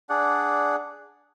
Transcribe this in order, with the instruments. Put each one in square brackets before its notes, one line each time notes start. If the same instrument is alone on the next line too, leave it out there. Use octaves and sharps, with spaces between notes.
[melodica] D4 G#4 D5 F#5